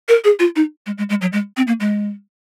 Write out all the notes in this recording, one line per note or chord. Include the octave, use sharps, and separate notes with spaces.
A#4
G#4
F4
D#4
G#3
G#3
G#3
F#3
G#3
C4
A#3
G#3